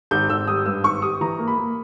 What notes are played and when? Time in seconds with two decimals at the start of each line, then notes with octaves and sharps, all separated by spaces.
0.11 G#1 G6
0.29 G#1 E6
0.47 G3 D#6
0.66 G2 E6
0.84 G#1 C#6
1.02 G3 D#6
1.21 E3 A#5
1.39 A#3
1.48 B5
1.57 A#3